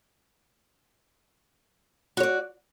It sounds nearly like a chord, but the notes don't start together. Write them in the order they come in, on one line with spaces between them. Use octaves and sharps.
F#4 C#5 D5